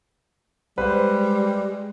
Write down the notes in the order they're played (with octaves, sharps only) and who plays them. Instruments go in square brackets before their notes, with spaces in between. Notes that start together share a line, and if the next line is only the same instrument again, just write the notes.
[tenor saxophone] G3 [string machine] G#3 [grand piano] B4 C5